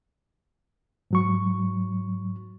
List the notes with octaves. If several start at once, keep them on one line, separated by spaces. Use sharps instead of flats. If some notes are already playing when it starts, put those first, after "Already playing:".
G#2 F#3 C#6